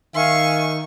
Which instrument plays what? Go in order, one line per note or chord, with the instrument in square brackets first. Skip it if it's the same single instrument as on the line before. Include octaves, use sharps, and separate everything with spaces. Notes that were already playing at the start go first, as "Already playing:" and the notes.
[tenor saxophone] D#3 [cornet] E5 [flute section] F5 G#5 [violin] C#6